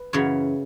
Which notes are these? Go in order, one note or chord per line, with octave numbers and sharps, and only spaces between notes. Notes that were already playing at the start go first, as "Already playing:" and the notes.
Already playing: B4
F#2 C#3 E3 C#5